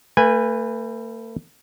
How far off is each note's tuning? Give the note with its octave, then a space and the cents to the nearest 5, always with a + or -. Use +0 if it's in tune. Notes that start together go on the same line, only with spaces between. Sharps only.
A3 +40 B4 +0 G#5 -20